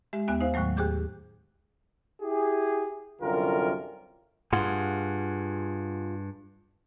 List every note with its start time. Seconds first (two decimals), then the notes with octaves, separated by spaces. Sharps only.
0.13 G#3 G4 E5
0.28 D#2 B3 E5 G#5 F#6
0.41 D#4 C5 F5
0.54 D#2 A2 D#3 F#3 A3
0.77 D#2 G4 G#4 D6 G6
2.22 E4 G4 G#4
3.22 C2 F#2 D3 F4 G4 A#4
4.53 G2 F4 G#4 F#5